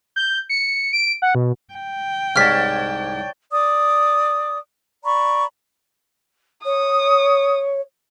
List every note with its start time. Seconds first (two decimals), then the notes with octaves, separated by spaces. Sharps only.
0.16 G6
0.49 C#7
0.93 D7
1.22 F#5
1.35 B2
1.73 G5
2.36 C2 G#2 C#5 D5 A5 F6 B6
3.52 D5 D6 D#6
5.04 D5 A#5 B5 C#6
6.65 C#5 D#6